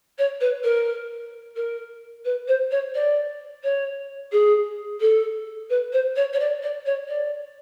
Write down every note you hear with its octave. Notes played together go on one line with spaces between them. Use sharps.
C#5
B4
A#4
A#4
B4
C5
C#5
D5
C#5
G#4
A4
B4
C5
C#5
C#5
D5
D5
C#5
D5